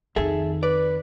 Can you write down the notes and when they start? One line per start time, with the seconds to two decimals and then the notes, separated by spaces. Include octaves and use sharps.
0.16 F2 D#3 G#4 A4 E5
0.63 B4 D5